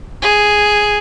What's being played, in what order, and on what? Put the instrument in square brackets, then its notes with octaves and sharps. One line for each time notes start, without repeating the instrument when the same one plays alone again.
[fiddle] G#4